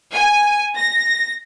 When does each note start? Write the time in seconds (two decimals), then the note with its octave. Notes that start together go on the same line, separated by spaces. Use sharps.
0.14 G#5
0.78 A#6